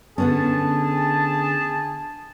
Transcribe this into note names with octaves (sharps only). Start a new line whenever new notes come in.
D3 B3 C#4 G#4 A5